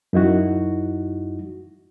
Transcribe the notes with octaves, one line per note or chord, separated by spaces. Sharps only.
F#2 D#4 E4 F#4